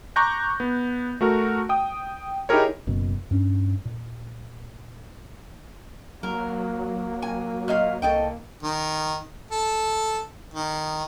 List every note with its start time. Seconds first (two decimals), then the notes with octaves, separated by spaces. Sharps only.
0.16 A#5 C#6 D6 F#6 G6 A#6
0.60 B3
1.21 A3 F#4 A#4
1.69 G5 D#6
2.49 D#4 E4 G4 G#4 A#4 C#5
2.87 F#1 F#2 B2
3.31 G2 C#4
3.85 A#2
6.23 F#3 A#3 A#4
7.22 G#5
7.68 A#2 D#5 F5
8.02 C2 A4 D#5 G5
8.63 D#3
9.51 A4
10.54 D#3